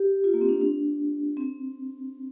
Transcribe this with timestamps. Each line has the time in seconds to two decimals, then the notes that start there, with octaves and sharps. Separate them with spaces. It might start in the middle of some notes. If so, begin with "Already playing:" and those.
Already playing: G4
0.24 F4
0.34 A#3
0.41 C4
0.49 D4
0.61 D4
1.37 C4